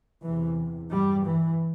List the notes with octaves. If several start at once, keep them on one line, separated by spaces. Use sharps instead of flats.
E2 C3 E3
G2 G3
E3